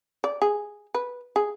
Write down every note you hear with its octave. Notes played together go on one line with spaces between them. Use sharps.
D5
G#4
B4
G#4